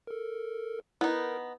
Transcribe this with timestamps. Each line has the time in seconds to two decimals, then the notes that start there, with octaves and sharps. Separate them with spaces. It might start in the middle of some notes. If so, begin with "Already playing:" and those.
0.07 A4 A#4
1.01 B3 D#4 E4 A#4